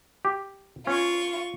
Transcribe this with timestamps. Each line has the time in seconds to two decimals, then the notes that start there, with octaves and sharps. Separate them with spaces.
0.25 G4
0.87 C#4 F4 C#6